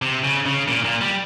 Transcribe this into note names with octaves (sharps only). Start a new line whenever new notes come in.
C3
C#3
C#3
A#2
A#2
G3